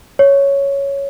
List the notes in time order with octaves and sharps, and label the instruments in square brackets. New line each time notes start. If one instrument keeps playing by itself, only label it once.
[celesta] C#5